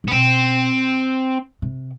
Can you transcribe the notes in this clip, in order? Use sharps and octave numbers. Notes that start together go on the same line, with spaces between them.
A2
B3
B2 C4
C3